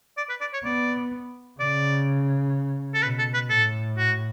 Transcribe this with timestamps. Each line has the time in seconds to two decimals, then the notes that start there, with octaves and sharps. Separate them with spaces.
0.17 D5
0.30 B4
0.41 D5
0.53 C#5
0.65 B3 D5
1.60 C#3 D5
2.94 A4
3.03 B2 B4
3.19 A4
3.34 B4
3.50 A2 A4
3.98 F#4